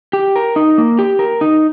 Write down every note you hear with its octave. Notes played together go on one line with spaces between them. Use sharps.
G4
A#4
D#4
A#3
G4
A#4
D#4